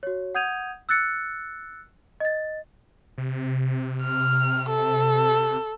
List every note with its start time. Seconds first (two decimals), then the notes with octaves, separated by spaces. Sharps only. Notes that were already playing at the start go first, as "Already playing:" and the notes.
0.03 F#4 C#5
0.35 F#5 D#6 G6 G#6 D#7 F7
0.89 E6 F#6 A6 C#7
2.20 D#5 A6
3.18 C3
4.04 F6
4.70 A4